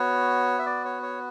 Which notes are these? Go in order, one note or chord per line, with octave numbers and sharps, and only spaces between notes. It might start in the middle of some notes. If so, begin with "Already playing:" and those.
Already playing: B3 F#4 C#5
E5
D5
C#5
C#5